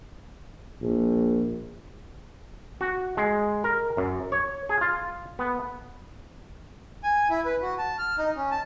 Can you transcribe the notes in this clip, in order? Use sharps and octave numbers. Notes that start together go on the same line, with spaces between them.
A#1
F#4
G#3
A#4
F#2
C#5
G#4
F4
B3
G#5
E4
B4
F#4
A5
F6
D#4
C#4
A5